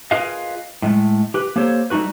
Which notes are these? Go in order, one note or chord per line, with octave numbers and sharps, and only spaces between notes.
F4 G#4 A#4 B4 D#5 F5
A2 G#3 A3
G4 B4
A#3 G4 A4 C5 C#5
G3 A3 D#4 F#4 B4